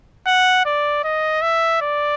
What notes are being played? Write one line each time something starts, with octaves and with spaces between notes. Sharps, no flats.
F#5
D5
D#5
E5
D5